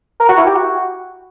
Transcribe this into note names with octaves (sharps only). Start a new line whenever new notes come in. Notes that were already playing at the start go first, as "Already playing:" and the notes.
A#4
F#4
E4
G4
F#4